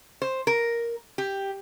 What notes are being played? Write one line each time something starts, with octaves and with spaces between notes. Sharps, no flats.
C5
A#4
G4